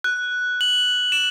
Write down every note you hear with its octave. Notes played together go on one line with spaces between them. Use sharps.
F#6
F#7
E7